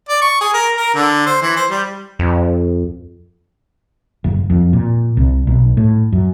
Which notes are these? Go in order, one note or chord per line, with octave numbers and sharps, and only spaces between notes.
D5
C#6
G#4
A#4
A#4
D3
C5
E3
C5
G3
F2
F#1
F2
A#2
C2
B1
A2
F#2